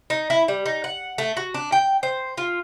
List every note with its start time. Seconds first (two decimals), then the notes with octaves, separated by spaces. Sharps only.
0.10 D#4
0.30 E4
0.48 G3
0.66 D#4
0.84 F#5
1.18 A3
1.37 F#4
1.54 D4
1.72 G5
2.03 C5
2.38 F4